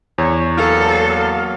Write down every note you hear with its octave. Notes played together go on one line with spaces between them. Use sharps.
E2 C#5
F#3 A#3 B3 A4 F5